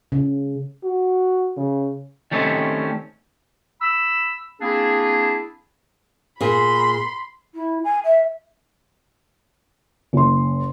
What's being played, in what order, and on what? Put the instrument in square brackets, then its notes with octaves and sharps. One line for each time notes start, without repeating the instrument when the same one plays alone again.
[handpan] C#3
[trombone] F#4
C#3
[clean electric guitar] D#3 G3 A3 C4 C#4
[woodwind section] B5 E6
A#3 C4 D4 E4 G#4
[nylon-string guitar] A#2 G#4 [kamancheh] B5 C6
[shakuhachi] E4
G#5
E5
[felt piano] F#1 C6